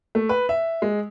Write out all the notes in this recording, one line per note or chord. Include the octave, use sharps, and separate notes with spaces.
A3
B4
E5
G#3